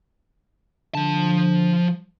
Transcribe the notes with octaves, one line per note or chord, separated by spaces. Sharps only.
D3 F3 A5